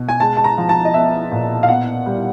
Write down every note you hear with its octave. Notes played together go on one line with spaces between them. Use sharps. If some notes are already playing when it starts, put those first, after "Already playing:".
Already playing: B2
G#5
G#3 A5
A5
A#5
F3
A5
D#5
B3 E5
A#2
F5
B3 F#5
G3